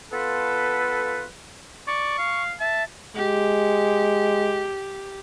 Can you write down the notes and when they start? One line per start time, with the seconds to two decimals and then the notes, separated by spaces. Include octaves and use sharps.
0.12 B3 F4 A4 B4
1.87 D5 C#6
2.19 F5
2.60 E5 A5
3.16 G#3 G4